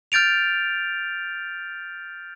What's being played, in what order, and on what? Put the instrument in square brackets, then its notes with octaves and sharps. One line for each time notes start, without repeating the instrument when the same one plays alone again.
[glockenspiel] F6 G6 A6 D7 F7